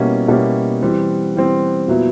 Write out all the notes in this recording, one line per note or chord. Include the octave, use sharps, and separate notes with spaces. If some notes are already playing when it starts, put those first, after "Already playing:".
Already playing: B2 G3 A#3 C#4 E4
B2 G3 A#3 C#4 E4
E3 G3 C4
E3 G3 C4
A#2 F#3 B3 E4